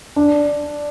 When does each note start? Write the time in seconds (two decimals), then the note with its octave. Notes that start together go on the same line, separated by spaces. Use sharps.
0.16 D4